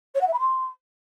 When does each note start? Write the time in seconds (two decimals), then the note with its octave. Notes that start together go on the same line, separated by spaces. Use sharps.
0.15 C#5
0.21 F#5
0.27 E5
0.33 B5
0.39 C6